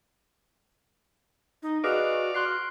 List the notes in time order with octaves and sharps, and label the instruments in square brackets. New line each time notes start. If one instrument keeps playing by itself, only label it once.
[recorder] D#4
[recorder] F#4 [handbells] G#4 B4 D#5 [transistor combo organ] D5 F5 D6
[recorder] F#4 [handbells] C6 F#6 C7